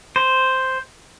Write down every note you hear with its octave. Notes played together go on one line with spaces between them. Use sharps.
C5